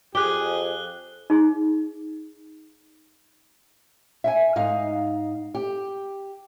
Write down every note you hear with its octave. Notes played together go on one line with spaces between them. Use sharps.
F2 G4 G#4 F#6 G7
D#4 G#4
E5 G5 G#5
G#2 D#4 F5
G4